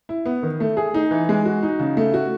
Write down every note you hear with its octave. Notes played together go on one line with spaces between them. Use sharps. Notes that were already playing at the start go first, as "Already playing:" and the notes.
E4
B3
D#3
A3
G#4
D#4
E3
G#3
F#4
D#4
C#3
A3
F#4